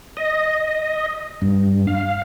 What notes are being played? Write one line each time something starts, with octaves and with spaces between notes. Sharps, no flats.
D#5
G2
F5